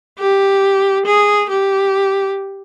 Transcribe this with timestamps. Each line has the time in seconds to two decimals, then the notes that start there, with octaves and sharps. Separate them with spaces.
0.19 G4
1.06 G#4
1.50 G4